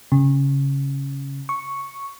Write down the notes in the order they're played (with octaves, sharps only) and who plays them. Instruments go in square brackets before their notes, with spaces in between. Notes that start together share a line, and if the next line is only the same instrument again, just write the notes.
[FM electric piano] C#3
C#6